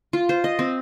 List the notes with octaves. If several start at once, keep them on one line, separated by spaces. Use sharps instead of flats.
F4
C5
D#5
C4